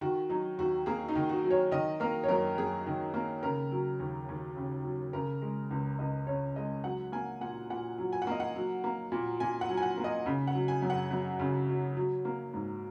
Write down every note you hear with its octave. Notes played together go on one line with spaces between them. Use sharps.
D#3 F#4
F#3 D#4
D#2 F#4
A#3 G#4
D#4
D#3
F#4
F#3
C#5
D#3 D#5
A#3 A#4
C#5
F#2 A#4
F#2 G#4
D#3
A#3
C#3 A#4
F#3
D#2
D#2
C#3
F#3
C#3 A#4
G#3
C#2
C#2 D#5
C#3 C#5
G#3 D#5
F#3 F#5
A#3 G#5
A#2 F#5
A#2 F#5
F#3
G#5
F#5
A#3 D#5
F#5
F#3
A#3
A#2
A#2 G#5
F#5
F#3
G#5
F#5
A#3
D#5
C#3
F#5
F#3
G#5
F#2
F#5
F#2
C#3
F#3
F#3
A#3
G#2